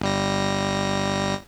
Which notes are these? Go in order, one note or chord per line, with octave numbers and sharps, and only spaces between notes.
G1 G3 A#6